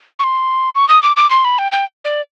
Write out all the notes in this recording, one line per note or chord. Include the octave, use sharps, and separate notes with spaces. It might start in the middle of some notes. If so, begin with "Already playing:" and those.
C#6
C6
C#6
D#6
D6
D6
C6
B5
G5
G5
D5